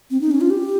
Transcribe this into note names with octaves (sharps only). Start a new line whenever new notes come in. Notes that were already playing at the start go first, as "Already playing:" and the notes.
C4
D#4
C#4
F4
G4